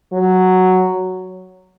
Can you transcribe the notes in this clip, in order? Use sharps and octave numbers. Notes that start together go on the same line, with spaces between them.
F#3